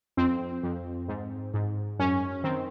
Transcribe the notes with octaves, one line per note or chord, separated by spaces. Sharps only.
F2 C4
F2
G#2
G#2
F#2 C#4
D#3 C4